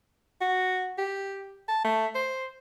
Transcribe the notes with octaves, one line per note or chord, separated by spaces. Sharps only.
F#4
G4
A5
A3
C5